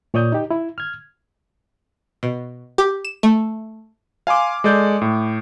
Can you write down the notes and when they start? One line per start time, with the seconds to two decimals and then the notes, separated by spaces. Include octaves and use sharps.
0.14 A#2 C#5 D5 D#6 G6
0.32 D#4 G4
0.51 E4
0.78 F6 G#6
2.23 B2
2.78 G4
3.05 E7
3.23 A3
4.27 F5 G#5 C6 D6
4.64 G#3 A4 D5 G6
5.01 A2